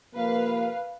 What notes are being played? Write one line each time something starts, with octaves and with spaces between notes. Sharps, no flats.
C3 F3 A#3 B4 F5